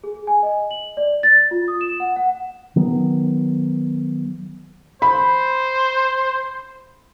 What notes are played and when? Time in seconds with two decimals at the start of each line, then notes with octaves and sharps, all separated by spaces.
0.04 G#4
0.27 G#5
0.43 D#5
0.71 F#7
0.97 D5
1.23 A6
1.51 F4
1.68 D#6
1.81 E7
2.00 F#5
2.16 F#5
2.76 D#3 F#3 B3
5.02 C5 B5